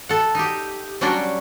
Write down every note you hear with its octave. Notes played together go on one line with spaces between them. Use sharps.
A4 F#5
D#4 G4
F#3 G3 C#4 D4 F#4 D5